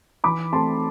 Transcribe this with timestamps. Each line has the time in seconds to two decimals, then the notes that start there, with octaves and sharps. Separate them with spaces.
0.24 E3 B5 D6
0.52 A3 C4 A5 C6